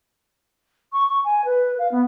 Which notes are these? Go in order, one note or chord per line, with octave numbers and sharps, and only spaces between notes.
C#6
C#6
G#5
B4
F5
B3